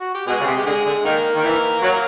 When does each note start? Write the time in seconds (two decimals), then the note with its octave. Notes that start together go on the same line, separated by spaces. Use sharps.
0.01 F#4
0.14 G4
0.27 B2 G#3 G#4
0.40 C#3
0.46 C3
0.57 G4
0.66 D3 G#3 G#4
0.85 D3
1.05 D#3 A#3 A#4
1.36 D#3
1.44 E3
1.82 F#3